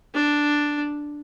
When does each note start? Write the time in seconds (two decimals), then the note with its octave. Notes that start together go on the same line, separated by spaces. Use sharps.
0.15 D4